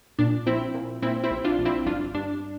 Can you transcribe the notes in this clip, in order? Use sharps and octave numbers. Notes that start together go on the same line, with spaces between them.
A#2 D4
A#1 C4 E4
A#2
A#2 C4 E4
C4 E4
A#1
D4 F4
A#1
C4 E4
G1 D4 F4
G2 D4